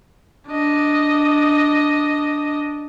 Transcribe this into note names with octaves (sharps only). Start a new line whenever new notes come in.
D4 D#5